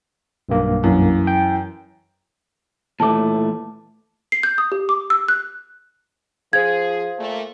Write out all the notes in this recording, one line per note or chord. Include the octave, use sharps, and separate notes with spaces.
B1 G2 A#3
F#2 E3
G5
A#2 E3 A3 A5 D6
C7
G6
D#6
G4
D6
E6
F#6
F3 G#4 C5 F5 G#6
A#2 A3